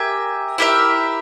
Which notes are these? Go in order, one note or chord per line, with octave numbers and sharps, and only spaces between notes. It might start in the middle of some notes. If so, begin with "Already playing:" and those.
Already playing: G4 A#4 E5 G#5
E4 G4 A#4 E5